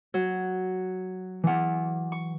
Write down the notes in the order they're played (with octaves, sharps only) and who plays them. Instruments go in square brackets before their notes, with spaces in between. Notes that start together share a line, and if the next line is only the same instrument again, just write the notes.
[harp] F#3
[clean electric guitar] E3 F#5
[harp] C#6